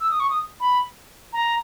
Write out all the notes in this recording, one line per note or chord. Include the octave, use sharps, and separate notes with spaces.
E6
D#6
C#6
D#6
B5
A#5